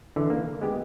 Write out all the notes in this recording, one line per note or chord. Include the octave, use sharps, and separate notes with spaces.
D3 E3
A#3
G#3 B3 G4